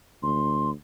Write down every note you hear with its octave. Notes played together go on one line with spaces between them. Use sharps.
D2 C6